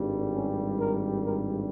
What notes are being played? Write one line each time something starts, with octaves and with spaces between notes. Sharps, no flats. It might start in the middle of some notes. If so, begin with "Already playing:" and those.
Already playing: G#1 G2 G3
C#4
A#4
A#4